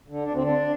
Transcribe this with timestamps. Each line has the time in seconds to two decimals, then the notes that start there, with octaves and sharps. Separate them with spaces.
0.08 D3
0.23 D2 D4
0.33 C4
0.38 D3 D4